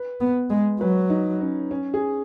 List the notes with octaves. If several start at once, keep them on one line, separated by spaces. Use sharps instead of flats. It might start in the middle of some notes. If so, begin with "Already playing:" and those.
Already playing: B4
B3
G#3
F#3 B4
D#4
C#4
C#4
G#4